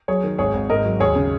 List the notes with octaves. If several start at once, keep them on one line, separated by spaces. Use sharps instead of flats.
F#3 G#4 C#5
D#3
G#1 G#4 C#5
G#1
G#2 A#4 D#5
F#3
D#2 G#4 C#5
C#3